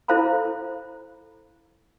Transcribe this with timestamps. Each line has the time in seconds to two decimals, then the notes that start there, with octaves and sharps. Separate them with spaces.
0.08 E4 A4 C5 F5 A#5 B5